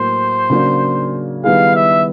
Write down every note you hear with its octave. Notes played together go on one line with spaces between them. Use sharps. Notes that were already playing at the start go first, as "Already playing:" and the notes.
Already playing: A2 F#3 A#3 C5
C#3 F#3 A#3 D4
D#3 G3 B3 E4 G#4 F5
E5